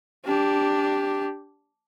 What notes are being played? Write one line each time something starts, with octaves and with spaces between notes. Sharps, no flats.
D4 G4